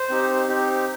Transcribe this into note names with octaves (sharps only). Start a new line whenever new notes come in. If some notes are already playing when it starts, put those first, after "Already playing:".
Already playing: C5
C4 D#4 G4
C4 D#4 G4